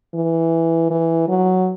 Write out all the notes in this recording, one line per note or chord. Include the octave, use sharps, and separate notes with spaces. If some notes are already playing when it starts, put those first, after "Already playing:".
E3
E3
F#3